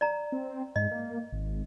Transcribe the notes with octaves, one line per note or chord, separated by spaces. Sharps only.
D5 A#5
C4
G#2 D#5
A#3
G#1